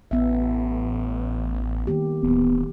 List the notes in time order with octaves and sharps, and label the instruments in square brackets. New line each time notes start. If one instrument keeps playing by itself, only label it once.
[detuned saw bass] A1 [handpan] B3 E5
[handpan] D#3 A#3 G4
[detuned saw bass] D1 [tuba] B3